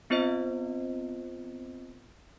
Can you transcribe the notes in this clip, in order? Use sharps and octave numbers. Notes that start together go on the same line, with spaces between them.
B3 C4 F4 C5 D#5